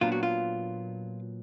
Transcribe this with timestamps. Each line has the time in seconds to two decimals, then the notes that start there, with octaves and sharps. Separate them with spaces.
0.01 A#2 F#3 B3 D4 F4
0.12 F#4
0.23 F4